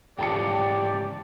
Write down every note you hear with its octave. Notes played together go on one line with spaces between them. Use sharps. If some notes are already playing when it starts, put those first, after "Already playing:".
G#2 C#3 E3 G4 D5 G5 A5 C#7